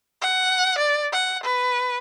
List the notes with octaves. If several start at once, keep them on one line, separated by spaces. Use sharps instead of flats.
F#5
D5
F#5
B4